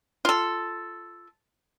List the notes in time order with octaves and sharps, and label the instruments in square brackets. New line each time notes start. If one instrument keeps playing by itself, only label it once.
[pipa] F4 A4